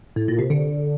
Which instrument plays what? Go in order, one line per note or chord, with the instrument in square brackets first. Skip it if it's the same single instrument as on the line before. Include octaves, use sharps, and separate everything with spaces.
[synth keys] A2
A#2
C3
D3